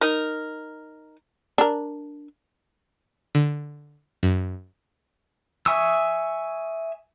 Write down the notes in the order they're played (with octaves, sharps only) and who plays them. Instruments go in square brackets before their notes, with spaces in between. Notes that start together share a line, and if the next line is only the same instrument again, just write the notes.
[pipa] D#4 A#4
[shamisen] D4 A#4
[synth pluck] D3
F#2
[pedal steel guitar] E5 G#5 C#6 D#6 E6